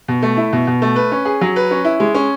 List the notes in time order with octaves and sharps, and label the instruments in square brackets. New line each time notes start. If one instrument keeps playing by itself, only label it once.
[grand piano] B2
A3
E4
B2
B2
A3
B4
C#4
G#4
F#3
B4
C#4
E4
G#3
C#4